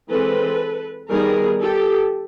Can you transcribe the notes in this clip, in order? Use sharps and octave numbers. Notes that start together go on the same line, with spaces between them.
E3 G#3 C4 A4 B4
D#3 G3 B3 G#4 A#4
G4 A4